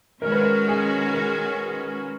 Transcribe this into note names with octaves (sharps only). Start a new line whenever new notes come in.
D#3 G#3 C#4 F#4 A#4
B4
A#4
G#4
A#4